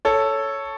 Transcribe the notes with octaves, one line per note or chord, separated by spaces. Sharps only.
A4 C#5